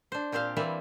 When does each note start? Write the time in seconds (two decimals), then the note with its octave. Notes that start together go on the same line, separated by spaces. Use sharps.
0.12 D4 C5
0.32 A#2 C4 G4 C5 F5
0.57 E3 G3 A#3 C4 D5 E5